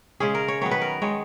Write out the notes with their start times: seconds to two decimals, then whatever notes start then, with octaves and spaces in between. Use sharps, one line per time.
0.20 C#3 G#3 C#4 G#4
0.35 A#4
0.48 C#5
0.61 D#3 F#3 B3 C#5
0.71 B4
0.81 A#4
1.02 D#3 G#3 B3 C#5